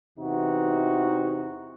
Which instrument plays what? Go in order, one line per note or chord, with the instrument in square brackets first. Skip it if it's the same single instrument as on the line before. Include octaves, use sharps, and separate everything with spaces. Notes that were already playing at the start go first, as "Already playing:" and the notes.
[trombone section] E2 C3 E3 D#4 F#4